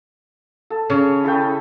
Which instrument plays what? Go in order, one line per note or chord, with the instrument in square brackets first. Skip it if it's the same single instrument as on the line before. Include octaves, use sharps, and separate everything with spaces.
[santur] A4
[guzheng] C#3 [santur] C#5
[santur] E4 A4 G5